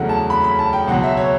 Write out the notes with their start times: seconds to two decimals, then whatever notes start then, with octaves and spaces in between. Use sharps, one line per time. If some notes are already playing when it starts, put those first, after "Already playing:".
Already playing: E2 C#3 F#3 A3 F#5
0.09 A5
0.30 B5
0.44 B5
0.59 A5
0.73 G5
0.88 C#2 B2 F#3 F#5
1.03 E5
1.17 C#5